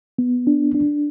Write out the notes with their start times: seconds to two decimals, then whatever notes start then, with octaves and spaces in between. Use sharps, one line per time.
0.18 B3
0.47 D4
0.74 D4